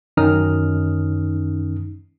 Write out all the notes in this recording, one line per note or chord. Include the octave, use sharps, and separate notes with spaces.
F#2 D#3 C#4 D#4 D#6 F6